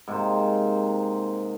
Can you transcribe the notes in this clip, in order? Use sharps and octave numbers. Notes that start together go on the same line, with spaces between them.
G#2 C3 A#3 C5